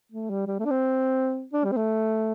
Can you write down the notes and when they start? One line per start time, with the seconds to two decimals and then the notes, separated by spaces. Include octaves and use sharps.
0.12 A3
0.30 G3
0.47 G3
0.59 A3
0.65 D4
0.71 C4
1.53 D4
1.65 G3
1.72 C4
1.77 A3